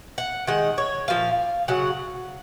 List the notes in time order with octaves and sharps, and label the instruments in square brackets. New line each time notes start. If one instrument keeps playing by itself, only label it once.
[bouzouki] F#5
D#3 G#3 F#5
C#5
A#2 F3 F5
C#3 F#3 F#5